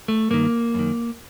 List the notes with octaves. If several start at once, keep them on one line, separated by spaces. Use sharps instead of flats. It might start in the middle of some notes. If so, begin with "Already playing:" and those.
A3
G2 D#3 A#3
F#2 D#3